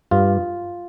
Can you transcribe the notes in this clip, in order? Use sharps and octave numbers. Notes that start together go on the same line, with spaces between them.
G2 F4